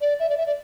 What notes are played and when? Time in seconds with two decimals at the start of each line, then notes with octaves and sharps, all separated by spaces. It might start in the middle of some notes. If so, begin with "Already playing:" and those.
0.01 D5
0.20 E5
0.29 D5
0.37 E5
0.46 D5